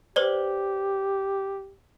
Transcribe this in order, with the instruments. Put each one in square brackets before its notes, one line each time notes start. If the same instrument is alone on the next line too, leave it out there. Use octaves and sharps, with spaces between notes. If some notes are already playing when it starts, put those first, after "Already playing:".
[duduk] G4 [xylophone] B4 C5 D5